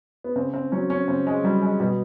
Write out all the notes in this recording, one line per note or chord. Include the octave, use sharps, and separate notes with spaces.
B3
C#3 C4
C4
F#3 C#4
C#4
C#3 C4
G#3
F#3 G3
G#3
B2 G3